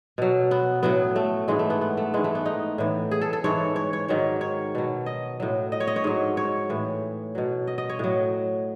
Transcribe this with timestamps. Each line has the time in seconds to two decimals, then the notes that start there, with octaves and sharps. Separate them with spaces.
0.18 B2 F#3
0.51 B3
0.83 A2 F#3 B3
1.16 A3
1.48 G#2 E3 G#3
1.59 A3
1.70 B3
1.81 B3
1.97 A3
2.14 G#2 E3 G#3
2.24 A3
2.35 B3
2.45 D#4
2.78 A2 E3
3.11 G#4
3.21 A4
3.33 A4
3.44 G#2 E3 C#5
3.76 C#5
3.93 C#5
4.08 G#2 D#3 F#3 C#5
4.41 C#5
4.75 B2 F#3
5.06 D#5
5.40 A2 F#3
5.72 D#5
5.80 C#5
5.87 D#5
5.96 C#5
6.04 G#2 F#3
6.37 C#5
6.70 A2 E3
7.35 B2 F#3
7.67 D#5
7.78 D#5
7.89 C#5
7.99 A2 F#3